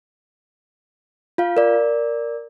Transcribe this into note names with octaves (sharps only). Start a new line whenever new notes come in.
F4 F5
A#4 D5